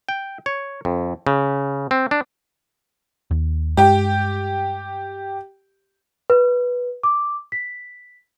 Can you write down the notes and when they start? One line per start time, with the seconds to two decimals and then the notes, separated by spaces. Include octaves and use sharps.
0.09 G5
0.46 C#5
0.85 F2
1.27 C#3
1.91 C4
2.11 D4
3.31 D#2
3.77 G2 G#3 G4 G5
6.30 B4
7.03 D6
7.52 B6